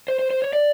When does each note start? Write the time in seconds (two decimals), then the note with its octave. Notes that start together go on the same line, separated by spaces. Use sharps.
0.08 C5
0.19 C5
0.30 C5
0.42 C#5
0.53 D5